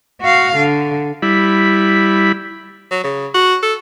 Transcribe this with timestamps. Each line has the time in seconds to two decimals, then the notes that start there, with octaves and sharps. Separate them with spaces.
0.21 F#4 F5
0.57 D3
1.22 G3 E4 B5
2.91 F#3
3.04 C#3
3.34 F#4
3.63 A4